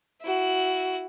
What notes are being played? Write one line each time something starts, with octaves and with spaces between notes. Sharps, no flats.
E4 F#4